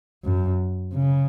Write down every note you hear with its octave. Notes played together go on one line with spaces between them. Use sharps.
F#2
C#3